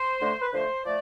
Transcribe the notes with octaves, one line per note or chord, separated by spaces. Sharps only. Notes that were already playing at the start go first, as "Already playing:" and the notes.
Already playing: C5
D3 A3
B4
D3 F3 A3 C5
F3 A3 D5